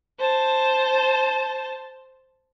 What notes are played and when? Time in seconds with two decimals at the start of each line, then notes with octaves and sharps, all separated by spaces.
0.18 C5 A5